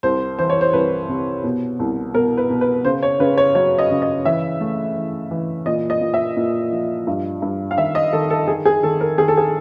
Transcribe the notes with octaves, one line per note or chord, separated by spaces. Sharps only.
C2 C5
E3 C5
C#5
C5
C2 B4
C3
B2
C2
B2 A#4
B4
B2
B4
C#3 C5
C#5
C#3 B4
C#5
F#3 C#5
D#5
C#3
D#5
E3 E5
A3
E3
E3
A#2 D#5
D#5
A#2
E5
A#2
F3
G2
G2
F5
D#3 E5
D#5
D#3 A4
A4
D#3 G#4
G#4
D#3 A4
A#4
D#3 G#4
A4
G#4